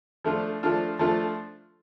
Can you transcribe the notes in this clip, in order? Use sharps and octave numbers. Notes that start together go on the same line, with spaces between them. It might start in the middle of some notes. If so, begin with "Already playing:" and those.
F3 A3 D4 F4
F3 A3 D4 F4
F3 A3 D4 F4